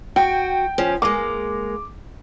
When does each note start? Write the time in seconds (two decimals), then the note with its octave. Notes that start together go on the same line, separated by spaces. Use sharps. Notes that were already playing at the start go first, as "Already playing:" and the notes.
0.16 F#4 G5
0.78 F3 C#4
1.02 G#3 A#3 D6